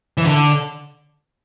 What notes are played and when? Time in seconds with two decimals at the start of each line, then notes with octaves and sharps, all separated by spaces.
0.18 E3
0.25 D3